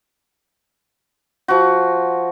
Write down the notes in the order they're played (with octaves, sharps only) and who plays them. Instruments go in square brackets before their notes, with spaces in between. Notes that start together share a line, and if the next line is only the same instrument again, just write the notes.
[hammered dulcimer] F3 F#4